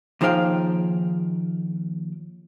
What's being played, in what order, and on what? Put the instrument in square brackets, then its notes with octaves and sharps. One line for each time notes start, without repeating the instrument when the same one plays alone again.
[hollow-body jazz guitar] D#2 F3 D#4 G#4 F5 G5